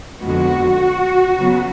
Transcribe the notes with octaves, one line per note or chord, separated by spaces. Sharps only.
F2 D3 F3 G#3 B3 F#4
C#3 F#3 B3